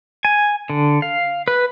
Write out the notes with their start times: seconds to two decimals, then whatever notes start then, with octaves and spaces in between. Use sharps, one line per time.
0.25 G#5
0.70 D3
1.02 F5
1.48 B4